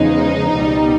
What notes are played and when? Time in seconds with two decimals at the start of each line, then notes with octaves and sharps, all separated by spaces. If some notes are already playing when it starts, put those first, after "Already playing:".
Already playing: E2 C#3 F3 G#3 B3 D#4
0.54 C#2 B2 G3